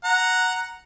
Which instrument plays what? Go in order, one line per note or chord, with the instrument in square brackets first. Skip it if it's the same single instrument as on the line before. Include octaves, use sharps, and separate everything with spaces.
[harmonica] F#5 A#5